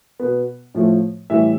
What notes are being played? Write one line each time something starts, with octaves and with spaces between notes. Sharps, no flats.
B2 B3
A2 F3 A3
A2 E3 G3 E5